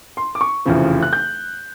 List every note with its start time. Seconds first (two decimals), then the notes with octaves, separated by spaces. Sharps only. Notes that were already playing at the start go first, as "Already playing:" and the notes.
0.17 C6
0.35 D6
0.41 C#6
0.65 F1 E2 C#3 F3
1.03 F#6
1.13 G6